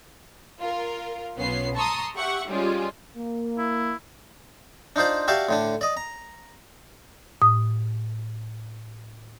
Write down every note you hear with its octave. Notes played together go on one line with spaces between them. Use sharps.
F4 A#4
B1 B3 C#4 F4 C7
A5 A#5 C6 C#6 D#6 E6
G4 E5 F#5 C#6
G3 G#3 C#4 F4
A#3
E4
D4 D#4 F4 C5 D5
F#4 G4 D5 E5 F5 A5
A2 D3 D4
D5 D#5
A#5
A2 D#6